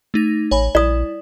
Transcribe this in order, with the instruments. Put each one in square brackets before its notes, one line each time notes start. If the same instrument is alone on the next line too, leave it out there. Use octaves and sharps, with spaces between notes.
[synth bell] A3 D#4 A#6
[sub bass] A1 [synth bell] C#5 G#5 B5
[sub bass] A#1 [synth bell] E4 [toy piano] D5 D#6